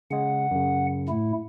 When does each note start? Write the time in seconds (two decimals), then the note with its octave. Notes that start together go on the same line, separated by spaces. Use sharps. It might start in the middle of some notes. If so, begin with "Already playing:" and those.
0.11 C#3 G#3 F#5
0.51 F#2 C#3
1.09 A2 A3 E4